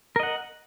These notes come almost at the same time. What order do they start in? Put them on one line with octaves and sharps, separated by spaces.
A#4 D#5 F#5